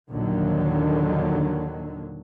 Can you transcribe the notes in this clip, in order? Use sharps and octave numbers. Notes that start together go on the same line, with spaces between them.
A#1 D#2 D3 D#3 F#3